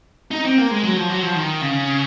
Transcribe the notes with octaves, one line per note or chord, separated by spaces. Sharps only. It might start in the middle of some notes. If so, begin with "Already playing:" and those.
D#4
C4
A#3
G#3
F#3
F3
F#3
F3
D#3
C#3